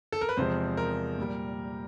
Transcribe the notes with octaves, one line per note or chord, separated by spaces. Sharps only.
A4
A#4
B4
E2 C3 F3 G#3 C5
A#4
A#2 G3